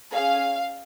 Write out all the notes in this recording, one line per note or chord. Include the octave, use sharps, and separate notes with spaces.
C#4 G#4 F5